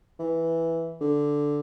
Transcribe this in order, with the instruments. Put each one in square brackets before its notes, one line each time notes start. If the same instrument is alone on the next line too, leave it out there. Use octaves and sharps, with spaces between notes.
[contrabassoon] E3
D3